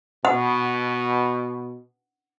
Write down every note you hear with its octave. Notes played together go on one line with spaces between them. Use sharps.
B2 F#5